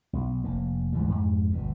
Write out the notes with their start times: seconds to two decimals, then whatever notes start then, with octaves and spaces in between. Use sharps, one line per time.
0.13 B1
0.44 F1 A#3
0.93 D2 G#2 E3 G3
1.10 F2 G#2
1.51 G1 D2 B2